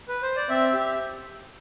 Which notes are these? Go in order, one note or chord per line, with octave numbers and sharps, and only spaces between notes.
B4
C5
D5
C4 E5
G4